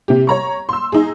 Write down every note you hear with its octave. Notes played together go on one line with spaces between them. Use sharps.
C3 G4
C#5 A#5 C#6
C6 E6
D#4 G#4